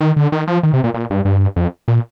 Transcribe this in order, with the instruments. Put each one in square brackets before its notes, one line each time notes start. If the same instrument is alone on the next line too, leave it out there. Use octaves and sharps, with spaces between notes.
[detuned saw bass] D#3
D3
D#3
F3
D#3
C3
A#2
A#2
G2
G2
F2
A#2